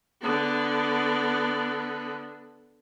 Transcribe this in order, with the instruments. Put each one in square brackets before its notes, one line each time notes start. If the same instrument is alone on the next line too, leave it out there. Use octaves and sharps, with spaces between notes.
[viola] D3 B3